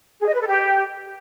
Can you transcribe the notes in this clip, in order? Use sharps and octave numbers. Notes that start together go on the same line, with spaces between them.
G#4
D#5
B4
A4
G4